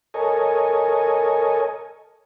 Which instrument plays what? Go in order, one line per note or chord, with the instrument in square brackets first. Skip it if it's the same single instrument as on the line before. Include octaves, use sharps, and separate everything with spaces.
[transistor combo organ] A4 A#4 C#5 D#5 G#5